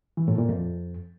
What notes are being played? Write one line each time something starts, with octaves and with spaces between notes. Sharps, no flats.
E3
A2
A#2
F2